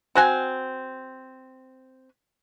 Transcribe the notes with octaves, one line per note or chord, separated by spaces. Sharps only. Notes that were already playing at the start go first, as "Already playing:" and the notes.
C4 F#4 G#5